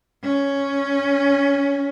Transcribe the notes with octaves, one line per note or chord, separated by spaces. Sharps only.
C#4